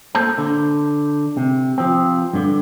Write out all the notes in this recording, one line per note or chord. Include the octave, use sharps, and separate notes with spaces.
A#3 A4 C5 A5
D3
C3
F3 C4
G2 D3